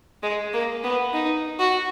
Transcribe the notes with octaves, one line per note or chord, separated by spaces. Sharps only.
G#3
A#3
B3
D#4
F#4